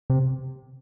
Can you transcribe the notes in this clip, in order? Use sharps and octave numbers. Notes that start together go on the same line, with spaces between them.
C3